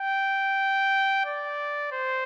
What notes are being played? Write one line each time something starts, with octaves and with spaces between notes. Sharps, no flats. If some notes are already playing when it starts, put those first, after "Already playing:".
Already playing: G5
D5
C5